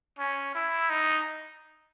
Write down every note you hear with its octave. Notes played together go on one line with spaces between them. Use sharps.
C#4
E4
D#4